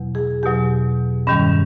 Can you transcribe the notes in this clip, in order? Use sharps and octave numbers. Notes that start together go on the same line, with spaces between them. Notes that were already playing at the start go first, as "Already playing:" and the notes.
Already playing: E2 B2 F#3
G#4
E2 B2 F#3 G4
G2 D#3 G3 C#4